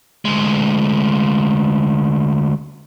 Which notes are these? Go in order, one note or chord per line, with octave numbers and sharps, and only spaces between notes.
D2 G#3